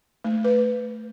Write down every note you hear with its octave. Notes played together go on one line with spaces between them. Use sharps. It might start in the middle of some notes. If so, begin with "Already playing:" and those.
A3
B4